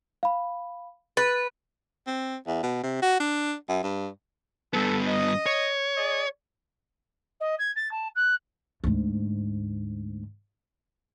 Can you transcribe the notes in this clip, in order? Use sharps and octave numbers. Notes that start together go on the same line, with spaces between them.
F5 B5
B4 A6
C4
E2
B2
C3
F#4
D4
F#2
G2
G2 B3 A4
D#5
C#5
G#4 D5 D#5
D#5
G#6
A6
A5
F#6
D2 G#2